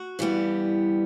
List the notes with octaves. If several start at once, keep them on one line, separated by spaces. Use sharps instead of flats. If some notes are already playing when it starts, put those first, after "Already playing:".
Already playing: F#4
G2 E3 G3 B3